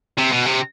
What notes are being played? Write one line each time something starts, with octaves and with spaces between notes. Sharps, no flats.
C3
B2
C3